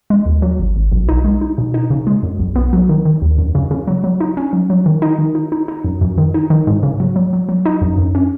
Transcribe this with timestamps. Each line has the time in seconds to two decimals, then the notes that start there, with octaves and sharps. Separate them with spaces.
0.10 G#3
0.26 D#2
0.42 F#3
0.59 G#1
0.76 G#1
0.92 B1
1.09 D#4
1.24 G#3
1.41 D#4
1.58 B2
1.74 D#4
1.90 C#3
2.07 G#3
2.23 F#2
2.39 B1
2.56 B3
2.73 F#3
2.89 D#3
3.05 D#3
3.22 D#2
3.38 F#2
3.55 C#3
3.71 C#3
3.87 F#3
4.04 F#3
4.20 D#4
4.37 C#4
4.53 F#3
4.70 F#3
4.86 D#3
5.02 D#4
5.19 D#3
5.35 D#4
5.52 D#4
5.68 D#4
5.84 F#2
6.01 F#2
6.18 D#3
6.34 D#4
6.50 D#3
6.67 G#2
6.83 C#3
7.00 F#3
7.16 F#3
7.33 F#3
7.49 F#3
7.66 D#4
7.82 F#2
7.98 F#2
8.15 C#4